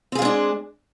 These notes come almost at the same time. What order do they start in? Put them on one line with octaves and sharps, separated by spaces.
C4 G#4 F4 G#3 D4